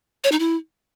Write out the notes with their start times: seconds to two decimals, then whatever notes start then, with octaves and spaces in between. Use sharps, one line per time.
0.24 C#5
0.32 D#4
0.39 E4